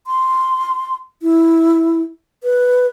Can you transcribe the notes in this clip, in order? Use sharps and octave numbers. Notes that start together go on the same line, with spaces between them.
C6
E4
B4